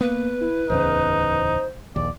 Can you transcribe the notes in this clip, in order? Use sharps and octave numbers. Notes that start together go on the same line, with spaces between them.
A#3 B3 B4
E4
D1 E2 C#3 D#4 C5
A#1 D#2 D5